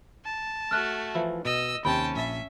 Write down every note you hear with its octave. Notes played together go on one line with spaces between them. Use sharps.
A5
A3 F#4 F6 F#6
E3 F3 E4
B2 D#5 E6
D#2 C3 C4 C#4 G5 A5 B5
A#1 E5 A5